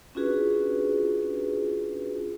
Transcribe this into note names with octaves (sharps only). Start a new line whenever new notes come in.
C#4 D4 F4 F#4 G#4 B4